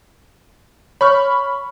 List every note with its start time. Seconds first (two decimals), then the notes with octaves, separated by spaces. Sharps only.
1.01 C#5 B5 C#6 F6